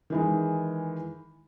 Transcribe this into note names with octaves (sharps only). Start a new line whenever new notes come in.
D#3 E3 G#3